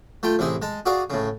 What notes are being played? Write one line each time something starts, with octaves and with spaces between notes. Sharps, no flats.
A3 F4 G5
A1 C3 E4 G#4
G#3 A5
F#4 G#4 D5 F5
A2 C#3